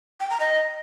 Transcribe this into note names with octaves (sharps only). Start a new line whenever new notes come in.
G5
A#5
D#5